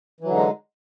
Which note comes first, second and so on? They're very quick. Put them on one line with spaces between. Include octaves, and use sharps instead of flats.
E3 F#3 D3 D#4 G#3